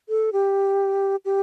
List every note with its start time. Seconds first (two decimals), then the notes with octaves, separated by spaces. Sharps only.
0.09 A4
0.33 G4
1.25 G4